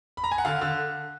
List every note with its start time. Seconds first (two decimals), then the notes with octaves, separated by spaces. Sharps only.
0.17 B5
0.24 A#5
0.31 G#5
0.38 F#5
0.45 D3 F5
0.61 D3